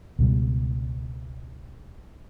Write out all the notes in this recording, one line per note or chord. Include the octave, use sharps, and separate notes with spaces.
C#2 B2 G3